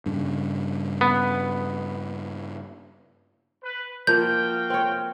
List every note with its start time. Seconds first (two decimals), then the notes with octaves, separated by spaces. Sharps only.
0.06 G2 C#3
1.01 B3
3.64 B4
4.07 F3 A#3 F#4 F5 G5 G6
4.70 C4 C#5